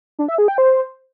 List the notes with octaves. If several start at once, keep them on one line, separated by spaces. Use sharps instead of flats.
D4
E5
G#4
G5
C5